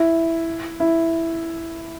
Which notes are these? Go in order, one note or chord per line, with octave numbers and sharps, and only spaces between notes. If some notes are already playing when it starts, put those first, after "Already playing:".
Already playing: E4
E4